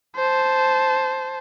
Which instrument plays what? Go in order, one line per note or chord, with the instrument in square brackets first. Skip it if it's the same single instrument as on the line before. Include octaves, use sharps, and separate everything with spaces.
[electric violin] C5 A5